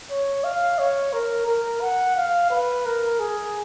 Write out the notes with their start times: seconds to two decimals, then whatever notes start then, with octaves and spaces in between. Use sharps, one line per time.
0.10 C#5
0.44 F5
0.78 C#5
1.13 A#4
1.47 A#4
1.81 F#5
2.16 F5
2.50 B4
2.85 A#4
3.19 G#4